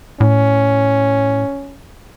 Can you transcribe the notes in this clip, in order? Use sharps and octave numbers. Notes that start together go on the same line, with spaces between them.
A2 C#4